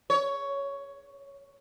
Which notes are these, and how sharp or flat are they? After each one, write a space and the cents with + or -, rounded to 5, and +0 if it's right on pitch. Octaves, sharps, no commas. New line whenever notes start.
C#5 +10